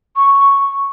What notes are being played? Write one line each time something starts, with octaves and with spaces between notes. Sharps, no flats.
C#6